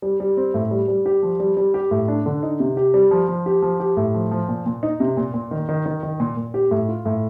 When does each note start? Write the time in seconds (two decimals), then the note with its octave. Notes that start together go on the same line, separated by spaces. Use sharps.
0.02 G3
0.20 G3
0.37 C4
0.54 A2
0.71 G3
0.88 G3
1.06 G4
1.23 F3
1.40 G3
1.57 G3
1.74 G4
1.91 A2
2.08 D4
2.26 D3
2.43 D#4
2.60 C3
2.77 G4
2.94 G3
3.11 F3
3.28 F3
3.46 G4
3.62 F3
3.80 G4
3.97 A2
4.14 F3
4.31 F3
4.49 A#2
4.66 A#2
4.83 D#4
5.00 C3
5.17 A#2
5.34 A#2
5.51 D#3
5.69 D#3
5.86 D#3
6.03 D#3
6.20 A#2
6.37 A#2
6.54 G4
6.71 A2
6.89 F4
7.05 A2